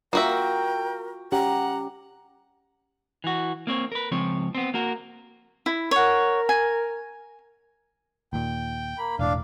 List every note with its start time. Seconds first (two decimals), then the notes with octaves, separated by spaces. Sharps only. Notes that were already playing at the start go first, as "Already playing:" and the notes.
0.13 A#3 F4 F#4 A#4 E5 G5
1.32 C#4 G4 F#5 A#5
3.24 E3 F#4
3.67 A#3 C4 C#5
3.92 A#4 B4
4.11 C#2 F3 C4 C#5
4.55 B3 C4
4.74 A#3 F#4 A#4
5.66 E4
5.91 A#4 C#5 F#5
6.49 G#5
8.33 D#2 A#2 G5
8.98 A#3 B5
9.19 E1 A2 D4 F5